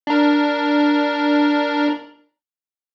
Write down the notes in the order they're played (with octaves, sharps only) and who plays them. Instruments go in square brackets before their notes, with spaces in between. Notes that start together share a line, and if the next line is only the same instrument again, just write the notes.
[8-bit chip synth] D4 A#4